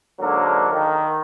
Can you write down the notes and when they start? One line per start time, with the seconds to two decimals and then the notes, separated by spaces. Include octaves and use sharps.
0.20 G#2 D3 F#3 A#3 A4 A#4
0.72 D#3